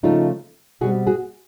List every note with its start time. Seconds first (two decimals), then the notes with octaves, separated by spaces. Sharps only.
0.03 C#3 F3 A3 D#4 F4
0.81 B2 G3 C4 F#4 G#4
1.07 F#4 G#4